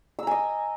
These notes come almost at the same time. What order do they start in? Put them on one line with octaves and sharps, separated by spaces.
E6 A#5 G#5 D#5